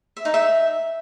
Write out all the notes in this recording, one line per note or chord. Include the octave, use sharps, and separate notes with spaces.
E5
D#4
E5